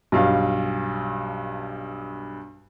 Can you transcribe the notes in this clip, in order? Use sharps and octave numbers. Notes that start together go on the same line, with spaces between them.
B1 G2 F5